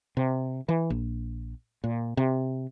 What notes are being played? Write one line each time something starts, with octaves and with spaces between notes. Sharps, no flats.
C3
E3
A#1
A#2
C3